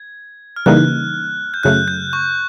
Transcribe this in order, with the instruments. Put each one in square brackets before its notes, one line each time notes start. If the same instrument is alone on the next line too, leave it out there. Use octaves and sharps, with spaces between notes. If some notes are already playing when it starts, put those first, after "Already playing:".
Already playing: [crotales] G#6
F6
[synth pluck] C#3 E3 G3 A#3 D#4 [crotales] F#6
[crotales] G6
[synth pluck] F#2 C#3 F#3 A3 [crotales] F#6
[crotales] G6
C#6